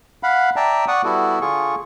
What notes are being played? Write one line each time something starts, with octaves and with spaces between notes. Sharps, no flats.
F5 F#5 B5
D5 E5 G5 A5 A#5
D5 F#5 C#6 D#6
G3 B3 E4 F#4 A4
D3 F4 G#4 C#6